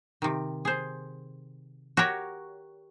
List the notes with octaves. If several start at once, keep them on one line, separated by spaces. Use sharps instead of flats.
C3 D#3
G#4 C5
F#4 G4 A#4 C#5